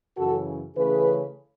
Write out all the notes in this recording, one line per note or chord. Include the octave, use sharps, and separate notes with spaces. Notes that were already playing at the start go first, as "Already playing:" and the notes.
F#2 C#3 E3 F#4 A4
C#3 E3 A3 C#4 G#4 B4